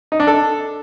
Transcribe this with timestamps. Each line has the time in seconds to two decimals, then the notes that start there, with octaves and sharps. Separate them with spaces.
0.12 D#4
0.20 D4
0.27 A4